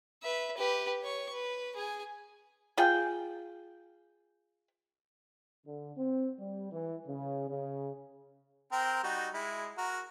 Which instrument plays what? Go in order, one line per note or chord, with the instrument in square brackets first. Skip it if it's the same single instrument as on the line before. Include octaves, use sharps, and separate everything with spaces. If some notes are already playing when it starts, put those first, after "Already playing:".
[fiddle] B4 E5
G4 B4
C#5 C#6
B4
G#4 G#5
[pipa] F4 G#4 G5
[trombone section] D3
C4
G3
E3
C#3
C#3
[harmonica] C4 A#4 G5
G3 D#4 F#4
G#3 E4
F#4 A#4